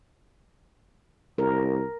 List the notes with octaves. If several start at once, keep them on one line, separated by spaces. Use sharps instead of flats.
C2 A#4